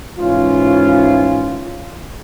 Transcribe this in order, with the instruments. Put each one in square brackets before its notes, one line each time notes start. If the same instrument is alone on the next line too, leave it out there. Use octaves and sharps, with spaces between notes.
[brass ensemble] G#2 E3 C#4 F4